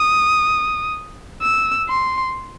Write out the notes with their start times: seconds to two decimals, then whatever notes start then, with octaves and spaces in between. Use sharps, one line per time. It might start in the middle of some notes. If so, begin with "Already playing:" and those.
Already playing: D#6
1.42 E6
1.89 C6